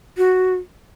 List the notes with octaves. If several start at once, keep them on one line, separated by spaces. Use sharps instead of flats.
F#4